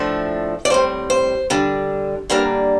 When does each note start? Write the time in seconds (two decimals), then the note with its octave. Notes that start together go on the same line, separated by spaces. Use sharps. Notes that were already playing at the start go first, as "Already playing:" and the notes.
Already playing: A2 F3 A3 D4
0.65 D5
0.70 A2 G3 C4 C5
1.10 C5
1.50 D3 G3 D4
2.30 D3 G3 A#3 D4 A#4